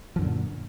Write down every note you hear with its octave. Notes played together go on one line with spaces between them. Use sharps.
F#2 A#2 D3 F3